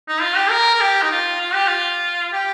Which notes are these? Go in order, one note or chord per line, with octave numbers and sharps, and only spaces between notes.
D#4
F4
G4
A#4
A#4
G4
D#4
F4
F4
G4
F4
G4